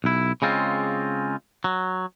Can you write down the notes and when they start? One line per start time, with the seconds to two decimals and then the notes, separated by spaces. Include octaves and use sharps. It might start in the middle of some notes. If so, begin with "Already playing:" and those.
0.04 B1 E4
0.42 C#3 G#3 C4 F4
1.64 F#3